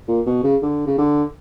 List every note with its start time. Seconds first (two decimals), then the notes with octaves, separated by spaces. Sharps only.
0.08 A#2
0.26 B2
0.43 C#3
0.62 D3
0.87 C#3
0.98 D3